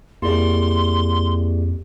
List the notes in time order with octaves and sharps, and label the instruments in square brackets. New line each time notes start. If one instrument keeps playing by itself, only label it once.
[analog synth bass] F2 [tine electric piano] A#3 E4 D5 [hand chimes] G4 G#4 [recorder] C6